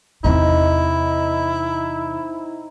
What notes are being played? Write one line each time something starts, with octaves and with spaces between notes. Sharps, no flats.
E2 C3 C4 D#4 E4